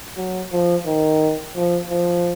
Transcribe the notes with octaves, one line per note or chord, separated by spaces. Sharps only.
F#3
F3
D#3
F3
F3